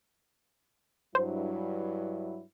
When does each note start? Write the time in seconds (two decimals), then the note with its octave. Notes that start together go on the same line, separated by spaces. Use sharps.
1.15 G2 F#3 E4 C5